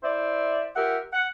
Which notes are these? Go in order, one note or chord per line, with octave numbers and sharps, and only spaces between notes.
E4 C5 D5 E5
F4 G4 A#4 E5 F#5
F#5